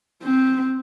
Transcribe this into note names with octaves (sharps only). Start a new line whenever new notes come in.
C4